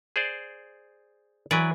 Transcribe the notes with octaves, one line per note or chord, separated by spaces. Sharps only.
G#4 C5 D5
E3 F#3 B4 D5